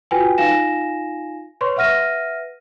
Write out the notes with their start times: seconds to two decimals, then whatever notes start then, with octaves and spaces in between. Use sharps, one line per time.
0.11 F4 F#4 B4 G5 G#5
0.38 D#4 F4 F5 G#5 A#6 E7
1.61 B4 C#5 C6 C#6
1.76 B4 E5 F#5 F6 A#6 D#7